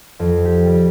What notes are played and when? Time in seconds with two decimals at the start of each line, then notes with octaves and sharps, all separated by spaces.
0.19 F2
0.45 G4
0.66 G3